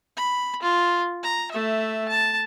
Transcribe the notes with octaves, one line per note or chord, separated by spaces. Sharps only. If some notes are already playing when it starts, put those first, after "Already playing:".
B5
F4
A#5
A3 E5
A5